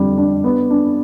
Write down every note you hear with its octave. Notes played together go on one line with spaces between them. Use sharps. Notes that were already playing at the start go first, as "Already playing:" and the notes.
Already playing: F2 D3 G3
D4
B3
D4